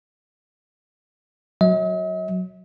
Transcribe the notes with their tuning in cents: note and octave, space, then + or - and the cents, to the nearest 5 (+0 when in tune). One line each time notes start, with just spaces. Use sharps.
F#3 +0 D#5 +45